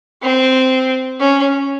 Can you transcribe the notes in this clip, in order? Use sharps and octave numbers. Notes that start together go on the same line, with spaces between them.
C4
C#4